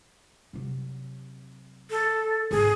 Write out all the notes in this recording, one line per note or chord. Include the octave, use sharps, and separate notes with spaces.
C3 F#3
A4
G#1 G#4